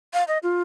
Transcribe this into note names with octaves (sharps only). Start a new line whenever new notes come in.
F5
D#5
F4